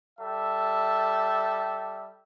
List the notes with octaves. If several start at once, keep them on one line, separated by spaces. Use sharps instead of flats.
G3 A4 E5